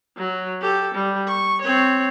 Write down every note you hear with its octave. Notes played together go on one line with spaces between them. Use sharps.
F#3
G4 A4
G3
C#6
C4 C#5